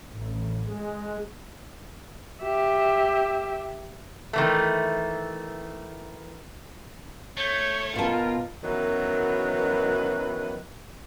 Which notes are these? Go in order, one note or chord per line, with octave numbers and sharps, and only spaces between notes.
A1
G#3
G4 E5
D#3 E3 A3
A3 C#5 G6
B2 F4 A#4 A5
F#2 D#3 E3 F#3 B3 B4